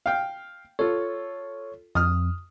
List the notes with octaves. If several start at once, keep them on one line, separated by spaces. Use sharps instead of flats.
F5 G5
F4 A4 C#5
F2 D#6 F6